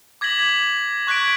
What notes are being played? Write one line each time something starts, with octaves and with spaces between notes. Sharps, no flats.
D6 G#6 A#6 B6 F#7
C#6 F#6 G#6 B6 D7